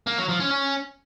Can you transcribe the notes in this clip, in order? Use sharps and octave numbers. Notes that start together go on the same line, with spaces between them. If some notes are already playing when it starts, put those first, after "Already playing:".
A#3
F#3
F3
C#4
C#4